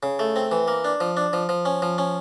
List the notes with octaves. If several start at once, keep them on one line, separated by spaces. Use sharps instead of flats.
C#3
A3
C4
E3
A#3
D4
F3
D4
F3
F3
C#4
F3
C#4